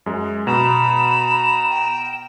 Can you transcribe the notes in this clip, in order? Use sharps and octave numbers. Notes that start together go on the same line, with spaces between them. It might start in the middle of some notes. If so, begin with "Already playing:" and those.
F#2 G#3
B2 A#5 B5 E7
G5